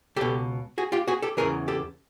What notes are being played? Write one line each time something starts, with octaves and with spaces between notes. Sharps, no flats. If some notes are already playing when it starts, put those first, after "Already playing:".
C#2 B2 G4 A4
F#4 G#4
F4 G4
F#4 G#4
G4 A4
E2 C#3 E3 G#4 A#4
G4 A4